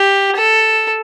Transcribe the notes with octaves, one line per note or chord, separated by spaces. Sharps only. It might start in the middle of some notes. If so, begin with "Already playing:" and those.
Already playing: G4
A4